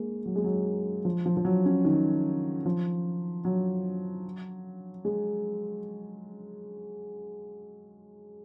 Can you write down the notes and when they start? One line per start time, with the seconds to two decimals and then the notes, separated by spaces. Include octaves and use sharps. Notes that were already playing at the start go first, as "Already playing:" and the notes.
Already playing: G#3 A#3
0.26 F#3
0.35 G#3
0.44 F#3
1.05 F3
1.26 F3
1.37 F3
1.45 F#3
1.66 C#4
1.85 D#3
2.65 F3
3.45 F#3
5.05 G#3